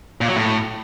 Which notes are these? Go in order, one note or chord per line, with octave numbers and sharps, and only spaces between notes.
A#2
F#3
A2